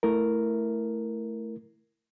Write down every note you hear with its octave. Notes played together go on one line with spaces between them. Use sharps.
A3 E4 A#4